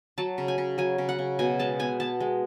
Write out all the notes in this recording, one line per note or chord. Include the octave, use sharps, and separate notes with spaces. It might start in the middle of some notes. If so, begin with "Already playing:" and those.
F#3 A5
C#3
G#5
C#3
F#3 G#5
C#3
F#5
C#3
B2 G#5
G#3 A5
B3 G#5
B3 A5
G#3